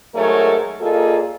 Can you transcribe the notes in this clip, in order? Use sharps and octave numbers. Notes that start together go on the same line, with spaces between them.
G#2 F#3 G#3 A3 A#4 C#5
A#2 A#3 F4 G#4 A4 D#5